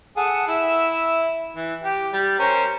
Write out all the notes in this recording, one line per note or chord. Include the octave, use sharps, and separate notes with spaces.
G#4 A4 F#5
E4 E5
E3
G4
G3
C#4 A#4 C5